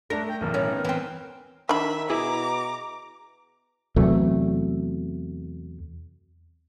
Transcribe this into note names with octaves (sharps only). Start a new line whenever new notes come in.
A3 D4 A#4 A#6
G5
B1 E2 A2 A#4
D#3 C#4
B3
E3 C4
D#3 D4 E5 B5
B2 E4 G#4 A#5 D6
E2 C3 F#3 A3